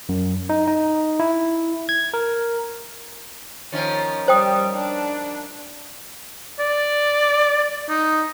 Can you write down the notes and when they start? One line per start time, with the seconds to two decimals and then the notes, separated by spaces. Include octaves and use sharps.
0.09 F#2
0.49 D#4
0.68 D#4
1.20 E4
1.89 G#6
2.14 A#4
3.72 D#3 F3 C#4
4.28 G3 C5 G5 D#6
4.76 D4
6.59 D5
7.89 D#4